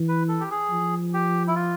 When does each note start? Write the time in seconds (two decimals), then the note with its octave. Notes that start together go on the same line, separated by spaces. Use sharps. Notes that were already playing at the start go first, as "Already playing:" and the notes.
Already playing: E3
0.08 B4
0.28 A4
0.40 G4
0.51 G#4
0.71 F3
1.14 G4
1.47 E4
1.55 F4